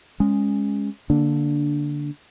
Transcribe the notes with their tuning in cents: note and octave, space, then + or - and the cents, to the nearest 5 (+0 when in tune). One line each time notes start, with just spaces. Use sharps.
G#3 -10 C#4 +0
D3 -15 A#3 +0 D4 +0